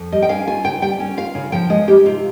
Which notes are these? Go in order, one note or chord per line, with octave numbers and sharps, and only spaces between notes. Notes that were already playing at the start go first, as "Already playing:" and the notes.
Already playing: F2
G3 D#5
G5
C#4 F5
F4 G#5
C#3 G5
G3 G5
C#4
F4 F5
C#3
F3 G5
G#3 D#5
D#4 G4
C3 F4